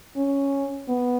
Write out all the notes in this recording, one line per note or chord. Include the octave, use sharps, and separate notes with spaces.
C#4
B3